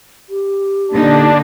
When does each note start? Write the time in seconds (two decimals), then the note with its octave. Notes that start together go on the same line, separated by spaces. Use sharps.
0.30 G4
0.91 A#2 D3 D4 D#4